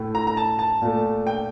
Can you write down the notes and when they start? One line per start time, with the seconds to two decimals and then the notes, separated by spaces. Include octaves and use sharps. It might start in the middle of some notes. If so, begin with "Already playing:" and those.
Already playing: A2 A3
0.15 A#5
0.27 A#5
0.37 A5
0.59 A5
0.82 A#2 A3
1.27 G5